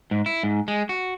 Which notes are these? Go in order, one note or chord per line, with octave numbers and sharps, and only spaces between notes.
G#2
E4
G#2
G#3
F#4